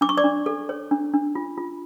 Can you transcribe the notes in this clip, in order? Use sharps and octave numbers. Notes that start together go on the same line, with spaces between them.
D4 D6
C#6
D5 D6
D4
A4
C#5
D4
D4
F4
F4